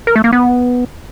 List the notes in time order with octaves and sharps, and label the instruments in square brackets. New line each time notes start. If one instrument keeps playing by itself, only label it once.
[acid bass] A#4
A3
A#3
B3